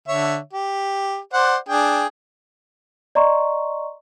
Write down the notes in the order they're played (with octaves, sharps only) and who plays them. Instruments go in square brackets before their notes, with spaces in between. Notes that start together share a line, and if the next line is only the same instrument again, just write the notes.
[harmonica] D3 C#5 E5
G4
C5 D5 F#5
D4 G#4 G5
[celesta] D5 D#5 A#5 C6 C#6